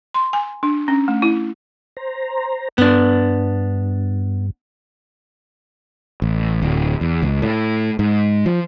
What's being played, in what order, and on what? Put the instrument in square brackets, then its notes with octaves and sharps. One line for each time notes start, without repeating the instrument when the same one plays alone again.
[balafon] C6
G#5
D4
C#4
A3
E4
[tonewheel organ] C5 A#5
[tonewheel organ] G2 [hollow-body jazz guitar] B3 D4
[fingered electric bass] A1
D1
E2
C#2
A2
G#2
F3